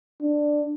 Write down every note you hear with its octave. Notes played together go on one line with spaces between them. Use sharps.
D4